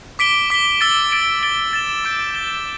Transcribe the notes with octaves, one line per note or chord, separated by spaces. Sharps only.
D6 B6 D7 G7
D6 B6 G7
E6 A6 D7 G7
A6 D7 G7
A6 D7 G7
A6 E7 G7
D6 G6 D7
A6 D7 G7